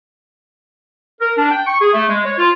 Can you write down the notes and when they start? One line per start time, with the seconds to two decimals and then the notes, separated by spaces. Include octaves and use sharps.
1.21 A#4
1.38 D4
1.51 G5
1.67 C#6
1.81 G#4
1.94 A3
2.09 G#3
2.25 C#5
2.38 F4